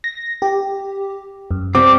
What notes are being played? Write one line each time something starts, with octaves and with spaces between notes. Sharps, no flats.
A#6
G4
F#2
G3 C4 D6